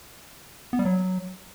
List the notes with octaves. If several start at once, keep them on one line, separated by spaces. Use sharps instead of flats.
B3
G3
F#3